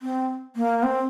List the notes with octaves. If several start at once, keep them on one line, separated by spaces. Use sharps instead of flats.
C4
A#3
C4